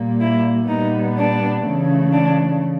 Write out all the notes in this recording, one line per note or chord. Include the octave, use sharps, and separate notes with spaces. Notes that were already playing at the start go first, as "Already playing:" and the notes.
Already playing: A#2 G3 A#3
E4
A#2 G3 B3 D#4
D4
C#3 E3 A3
D4